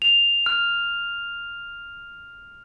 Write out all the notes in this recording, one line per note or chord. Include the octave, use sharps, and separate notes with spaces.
F7
F6